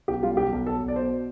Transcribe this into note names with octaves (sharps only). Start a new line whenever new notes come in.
B1 G4
G3 F4
B1 G4
B1
B1 A4
B1
D5
B2 C5